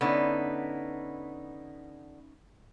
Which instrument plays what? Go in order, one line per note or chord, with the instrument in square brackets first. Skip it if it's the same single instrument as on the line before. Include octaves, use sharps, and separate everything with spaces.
[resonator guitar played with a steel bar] D3 B3 [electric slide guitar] C#4 D#4 E4